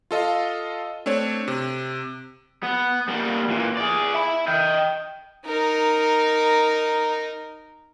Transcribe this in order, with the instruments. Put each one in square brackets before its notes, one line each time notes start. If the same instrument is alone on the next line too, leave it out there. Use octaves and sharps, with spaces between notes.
[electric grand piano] F4 A4 D#5 F5
A3 C4 D4 C#5
C3
[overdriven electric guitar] B3
A#2 G3
A#2 E3
G#4 D5
E5 B5
D#5 G5
[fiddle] D#4 A#4